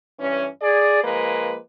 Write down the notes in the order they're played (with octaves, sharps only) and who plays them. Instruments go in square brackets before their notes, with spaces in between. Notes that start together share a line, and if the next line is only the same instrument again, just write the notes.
[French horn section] G2 E3 C#4
G#4 D5
F3 G#3 A#3 B4